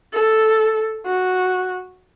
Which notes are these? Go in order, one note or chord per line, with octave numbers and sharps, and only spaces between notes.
A4
F#4